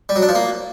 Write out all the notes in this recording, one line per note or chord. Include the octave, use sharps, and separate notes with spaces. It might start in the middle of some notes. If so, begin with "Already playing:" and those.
G3
F#3
D4
F3
A#3